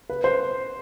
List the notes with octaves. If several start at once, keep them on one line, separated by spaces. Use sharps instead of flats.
B4
C5